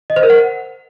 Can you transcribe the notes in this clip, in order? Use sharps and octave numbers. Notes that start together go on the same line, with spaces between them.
D#5
C5
A#4
F#5